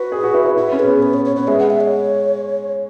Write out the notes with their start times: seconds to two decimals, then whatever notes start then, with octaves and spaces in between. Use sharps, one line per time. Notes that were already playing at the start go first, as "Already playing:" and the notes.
Already playing: F#4 B4
0.12 G#4
0.23 F#4
0.34 E4
0.46 E4
0.57 E4 B4
0.72 C#4
0.79 G#4
0.87 B3
1.02 B4
1.14 C#5
1.25 C#5
1.36 B3 C#5
1.48 G#3 E5
1.59 F#5
1.70 E5
1.82 C#5